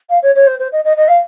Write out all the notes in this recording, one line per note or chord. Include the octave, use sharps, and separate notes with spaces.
F5
C#5
C#5
C5
C5
D#5
D#5
D#5
F5